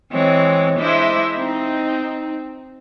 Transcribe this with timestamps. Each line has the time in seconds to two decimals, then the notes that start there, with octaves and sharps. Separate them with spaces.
0.12 E3 G#3 C4 C#5
0.79 G#3 D4 E4 C5 D#5 E5
1.37 C4 D#4